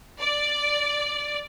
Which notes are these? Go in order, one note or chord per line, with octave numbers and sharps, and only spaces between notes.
D5